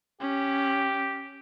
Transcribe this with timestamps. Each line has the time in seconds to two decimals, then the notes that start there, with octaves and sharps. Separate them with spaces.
0.20 C#4 G4